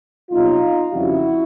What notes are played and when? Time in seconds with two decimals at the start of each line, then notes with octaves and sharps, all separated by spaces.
0.31 C2 B2 F#3 D#4 F4
0.93 F2 C#3 E3 G3 E4 F#4